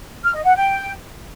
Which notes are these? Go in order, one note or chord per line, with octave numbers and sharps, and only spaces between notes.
F6
D#5
F#5
G5